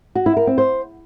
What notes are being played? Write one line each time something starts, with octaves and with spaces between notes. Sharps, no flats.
F#4
E4
A#4
C4
C5